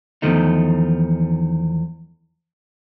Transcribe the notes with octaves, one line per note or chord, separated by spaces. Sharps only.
E2 A#2 D#3 F3 A3 D#4